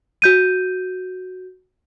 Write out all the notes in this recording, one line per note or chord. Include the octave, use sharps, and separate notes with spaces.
F#4 G6 D#7